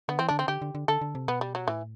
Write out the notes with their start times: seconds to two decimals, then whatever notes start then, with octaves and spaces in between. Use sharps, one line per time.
0.09 D3 B3
0.19 E3 C4
0.28 D3 D4
0.39 C4
0.48 D3 G4
0.62 D3
0.75 D3
0.88 D3 A4
1.01 D3
1.15 C3
1.28 B2 B3
1.41 G3
1.55 F#3
1.68 A2 E3